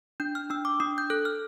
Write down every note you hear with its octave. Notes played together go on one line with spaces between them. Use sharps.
D4 G6
F6
D4 E6
D6
D4 D#6
G6
A4 F#6
F6